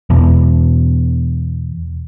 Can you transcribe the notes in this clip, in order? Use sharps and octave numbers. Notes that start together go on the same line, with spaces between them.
E2 B2